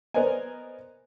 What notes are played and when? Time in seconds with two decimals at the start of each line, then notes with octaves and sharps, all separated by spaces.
0.14 B3 A#4 C5 D5 D#5 G#5